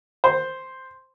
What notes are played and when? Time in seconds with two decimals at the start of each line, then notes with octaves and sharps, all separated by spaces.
0.24 C5